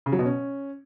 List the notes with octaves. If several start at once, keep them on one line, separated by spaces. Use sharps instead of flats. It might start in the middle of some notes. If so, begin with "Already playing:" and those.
C#3
F#3
B2
C#4